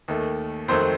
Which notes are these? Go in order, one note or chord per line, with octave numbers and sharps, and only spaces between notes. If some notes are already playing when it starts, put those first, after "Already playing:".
D#2 D#3 A3
F2 D#3 F#3 A3 C4 C5 C6